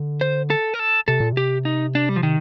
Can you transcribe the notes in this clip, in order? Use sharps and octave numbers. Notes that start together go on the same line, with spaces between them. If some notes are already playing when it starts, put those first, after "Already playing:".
Already playing: D3
C5
A4
A#4
A4
C3 A4
A#2
C3 G4
D#4
D4
G3
F3
D#3